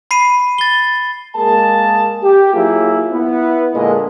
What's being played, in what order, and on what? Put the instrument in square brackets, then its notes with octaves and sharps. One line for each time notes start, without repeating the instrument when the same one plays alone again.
[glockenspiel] B5 C7 D#7
A6 G7
[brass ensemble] G#3 A#3 G#4 A#4 A5
G4
F#3 A#3 E4 F4 G#4
B3 E4
A#2 D3 G#3 A#3 D#5